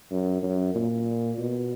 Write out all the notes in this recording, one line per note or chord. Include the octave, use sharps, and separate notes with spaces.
F#2
F#2
A#2
B2